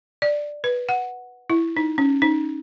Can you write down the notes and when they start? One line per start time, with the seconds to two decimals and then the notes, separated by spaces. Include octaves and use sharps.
0.22 D5
0.64 B4
0.89 F#5
1.50 E4
1.77 D#4
1.98 C#4
2.22 D#4